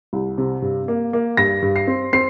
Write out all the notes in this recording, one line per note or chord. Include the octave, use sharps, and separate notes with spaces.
C2
C3
G2
A#3
A#3
G2 A#6
G2
C7
C4
C4 C7